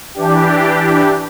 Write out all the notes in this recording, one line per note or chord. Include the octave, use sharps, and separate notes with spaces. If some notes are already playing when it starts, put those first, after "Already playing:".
E3 D4 G4